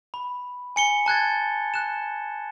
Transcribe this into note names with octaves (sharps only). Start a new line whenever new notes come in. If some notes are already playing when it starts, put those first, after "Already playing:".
B5
G#5 C#7 G7
A5 F#6 G#6 A6
F#6 E7